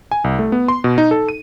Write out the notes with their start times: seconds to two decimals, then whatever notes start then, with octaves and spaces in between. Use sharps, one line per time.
0.12 G#5
0.24 C2
0.39 A3
0.52 B3
0.68 C6
0.84 B2
0.98 D#4
1.11 A4
1.29 D#7